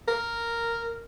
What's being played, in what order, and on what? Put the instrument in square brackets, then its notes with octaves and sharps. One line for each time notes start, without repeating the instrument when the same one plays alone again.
[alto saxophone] A#4